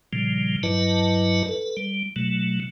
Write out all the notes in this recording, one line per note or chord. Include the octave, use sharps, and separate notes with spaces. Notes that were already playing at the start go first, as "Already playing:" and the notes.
A#2 C#3 F3 G3
G2 F#3 E4 B4 D#5 A5
A4 B4
G3
B2 F#3 A3